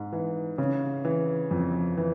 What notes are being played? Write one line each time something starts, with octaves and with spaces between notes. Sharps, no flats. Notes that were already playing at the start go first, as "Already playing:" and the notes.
Already playing: G#2
E3
C#3
E3
F2
E3